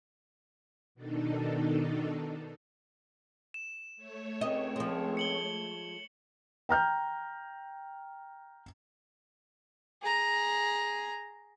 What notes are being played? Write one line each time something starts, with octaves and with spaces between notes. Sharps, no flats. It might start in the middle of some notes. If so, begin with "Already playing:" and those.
B2 D#3 D4 D#4 A4
E7
A3 C#5
C#2 D#3 C4 D#5
F3 G#3
C#7 F#7 G7
G5 A#5 F6 G6
G#4 A#5